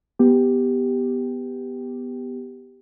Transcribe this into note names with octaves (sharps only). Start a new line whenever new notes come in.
B3 G4